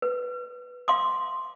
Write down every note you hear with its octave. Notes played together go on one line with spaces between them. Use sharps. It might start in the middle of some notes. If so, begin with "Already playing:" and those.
B4
F5 C6 D6